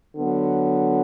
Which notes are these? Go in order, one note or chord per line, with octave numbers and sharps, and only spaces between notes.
D3 F#3 B3